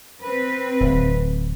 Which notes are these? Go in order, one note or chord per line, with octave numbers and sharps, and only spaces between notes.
C4 B4
D1